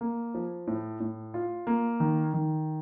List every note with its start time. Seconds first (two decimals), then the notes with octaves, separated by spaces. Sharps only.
0.01 A#3
0.35 F3
0.67 A2
1.00 A2
1.34 F4
1.67 A#3
2.00 D#3
2.34 D#3